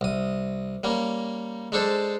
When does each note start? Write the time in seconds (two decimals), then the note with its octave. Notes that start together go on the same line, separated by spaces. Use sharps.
0.01 C2 D#6
0.84 G3 A#3 C#4
1.72 G#3 D4 A4 C5